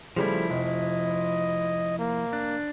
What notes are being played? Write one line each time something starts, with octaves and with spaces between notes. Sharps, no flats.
C#3 F3 G3 A3 E4 C5
F1 D#5
A#3
D4